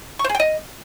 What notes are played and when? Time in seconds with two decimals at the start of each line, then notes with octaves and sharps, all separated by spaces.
0.19 C#6
0.24 C5
0.29 G#4
0.35 G5
0.40 D#5